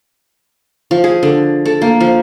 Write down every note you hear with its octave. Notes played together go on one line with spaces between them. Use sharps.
F3
G#4
D3
A4
A#3
F3